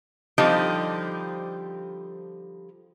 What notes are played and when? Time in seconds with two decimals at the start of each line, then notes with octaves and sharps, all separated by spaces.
0.38 D3 F3 G3 C4 D#4 G4